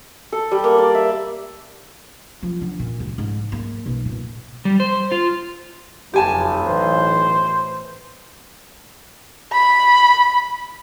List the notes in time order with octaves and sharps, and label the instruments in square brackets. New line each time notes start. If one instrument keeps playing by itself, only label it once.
[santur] A4
G3
A#3
D5
E5
[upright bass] F3
D3
A#2
C#2
G#2
A#3
B1
A#2
[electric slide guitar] G3
C5
F4
[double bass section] F#1 F2 [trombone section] B1 [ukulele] G4 G#5 A5
[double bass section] A1 E3 [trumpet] C5
[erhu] B5